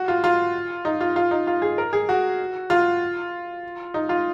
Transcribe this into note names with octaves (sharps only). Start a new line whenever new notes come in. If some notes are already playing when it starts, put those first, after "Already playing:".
Already playing: F#4
F4
F4
D#4
F4
F4
D#4
F4
G#4
A#4
G#4
F#4
F4
D#4
F4